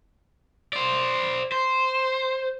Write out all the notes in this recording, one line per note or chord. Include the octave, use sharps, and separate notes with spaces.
C5 D5
C5